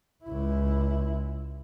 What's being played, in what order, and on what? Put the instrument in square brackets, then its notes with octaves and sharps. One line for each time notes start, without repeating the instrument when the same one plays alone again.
[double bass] C#2 E4